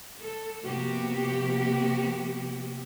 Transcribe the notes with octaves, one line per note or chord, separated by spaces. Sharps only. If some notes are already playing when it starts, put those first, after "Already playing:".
A4
C3 F3 A#3 B3 F#4 G4